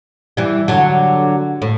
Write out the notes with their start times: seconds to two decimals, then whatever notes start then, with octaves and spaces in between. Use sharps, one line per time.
0.37 E3 G3
0.68 D3 F#3
1.62 A2